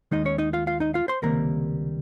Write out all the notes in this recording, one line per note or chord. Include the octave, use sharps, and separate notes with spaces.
D#2 D#3 G#3 D#4 D#5
C#4 C#5
D#4 D#5
F4 F5
F4 F5
D#4 D#5
F4 F5
C5 C6
C#2 C3 D#3 G3 A#3 A#4 A#5